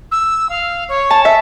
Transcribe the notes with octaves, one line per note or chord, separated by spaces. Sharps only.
E6
F5
C#5
A5
E5